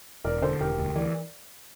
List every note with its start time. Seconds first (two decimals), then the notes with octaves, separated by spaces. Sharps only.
0.25 E1 A#4 D5
0.42 D3 A4 C5
0.60 E1 G4 A#4
0.78 D2
0.96 E3 A#4 D5